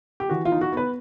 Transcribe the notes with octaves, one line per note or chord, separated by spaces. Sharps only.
G4
E3 F#4
F4
D#4
F#4
B3 B4